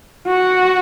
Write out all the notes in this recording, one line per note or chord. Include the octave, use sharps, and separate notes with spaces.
F#4